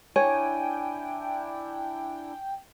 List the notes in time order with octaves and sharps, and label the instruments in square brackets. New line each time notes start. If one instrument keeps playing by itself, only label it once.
[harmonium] D4 E4 [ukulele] C#5 [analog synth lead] G5 [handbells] G#5